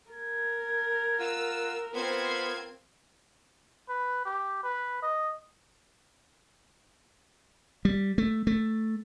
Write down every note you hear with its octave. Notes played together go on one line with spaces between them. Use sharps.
A#4 G#6
F4 F#5 E6
B3 C4 F4 C5 G#6
B4
G4
B4
D#5
G3
A3
A3